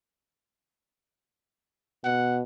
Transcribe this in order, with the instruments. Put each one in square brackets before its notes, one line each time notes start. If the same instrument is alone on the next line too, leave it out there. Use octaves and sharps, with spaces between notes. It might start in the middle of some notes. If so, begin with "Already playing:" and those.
[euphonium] B2 [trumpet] F#5